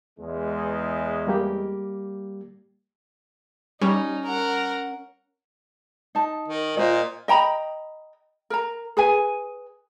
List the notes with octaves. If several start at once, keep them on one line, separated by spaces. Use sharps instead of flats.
E2 G#3
G3 A#3 G4
G3 C#4 D#4
A#4 F#5
D#4 A5
D#3
A#2 F4 C5 D#5
D#5 G5 A#5 B5
A#4 A#5
G#4 B4 G#5